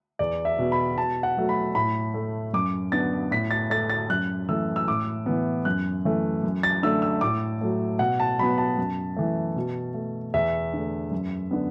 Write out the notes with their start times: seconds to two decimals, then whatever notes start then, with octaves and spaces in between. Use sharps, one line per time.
0.19 E2 D5
0.45 E5
0.58 B2 B3
0.72 B5
0.97 B2 A5
1.23 F#5
1.37 F#3 A3
1.49 B5
1.75 A2 B5
2.14 A3
2.53 F#2 D6
2.92 D3 B3 A6
3.31 A2 B6
3.51 A6
3.70 A3 A6
3.90 A6
4.09 F#2 F#6
4.49 E3 A3 E6
4.76 E6
4.88 A2 D6
5.26 E3 B3
5.65 F#2 F#6
6.05 E3 A3
6.43 F#2
6.63 A6
6.83 D3 A3 E6
7.02 E6
7.21 A2 D6
7.61 F#3 A3
7.99 B2 F#5
8.20 A5
8.39 F#3 B3 B5
8.58 A5
8.77 F#2
9.17 E3 A3
9.56 B2
9.94 A3
10.34 E2 E5
10.74 D3 A3
11.11 F#2
11.51 D3 B3